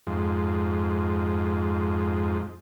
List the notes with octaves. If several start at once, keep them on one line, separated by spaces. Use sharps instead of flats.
F2 G#2